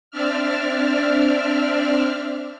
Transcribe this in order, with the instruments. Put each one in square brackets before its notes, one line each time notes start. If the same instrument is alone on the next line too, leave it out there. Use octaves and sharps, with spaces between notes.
[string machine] C4 D4 D5 E5 F6